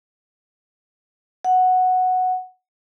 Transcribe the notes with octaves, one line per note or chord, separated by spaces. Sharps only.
F#5